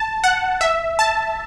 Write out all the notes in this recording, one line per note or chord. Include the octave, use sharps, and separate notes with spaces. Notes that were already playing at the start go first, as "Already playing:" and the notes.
Already playing: A5
F#5
E5
A5